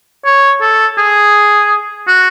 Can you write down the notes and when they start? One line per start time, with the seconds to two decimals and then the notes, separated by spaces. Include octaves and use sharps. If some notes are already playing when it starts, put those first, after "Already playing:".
0.25 C#5
0.61 A4
0.98 G#4
2.07 F#4